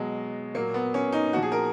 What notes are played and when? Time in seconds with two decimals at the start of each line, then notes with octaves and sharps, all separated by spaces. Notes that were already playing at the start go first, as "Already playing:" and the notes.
Already playing: B2 F#3 G#3
0.54 A#2 F#3 A#3
0.74 B3
0.94 C#4
1.12 D#4
1.32 A#2 F#4
1.37 F3
1.42 G#4
1.52 A#4